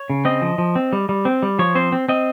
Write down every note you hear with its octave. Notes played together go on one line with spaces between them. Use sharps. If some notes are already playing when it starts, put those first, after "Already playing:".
Already playing: C#5
C#3
C4 D#5
F3
F3
C4
G3
G3
C4
G3
F3 C#5
C4 C5
C4
C4 D#5